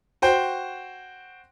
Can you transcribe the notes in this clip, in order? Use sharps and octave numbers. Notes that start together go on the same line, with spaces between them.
F#4 C5 G5